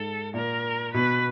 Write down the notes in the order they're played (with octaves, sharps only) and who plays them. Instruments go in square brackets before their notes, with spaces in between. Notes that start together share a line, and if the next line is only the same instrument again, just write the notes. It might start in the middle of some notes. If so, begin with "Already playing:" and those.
Already playing: [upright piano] G#2 [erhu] A4
[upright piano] A#2 [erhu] A#4
[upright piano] B2 [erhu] B4